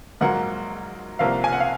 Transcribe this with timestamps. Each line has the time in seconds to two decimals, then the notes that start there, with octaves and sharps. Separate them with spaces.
0.21 A#1 G#2 F#3 A#3 F#5
1.19 C2 C3 F3 A#3 F5
1.44 G#5
1.53 F#5
1.60 F5